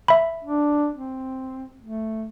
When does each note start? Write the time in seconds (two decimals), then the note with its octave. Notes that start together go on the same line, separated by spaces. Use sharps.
0.08 E5 B5
0.44 D4
0.94 C4
1.82 A3